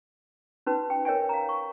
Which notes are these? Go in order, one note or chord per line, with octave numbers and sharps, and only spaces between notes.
C#4 D#4 F#4 B4
G5
A#4 C#5 D#5 E5 G5 G#5
F5 A#5
C#6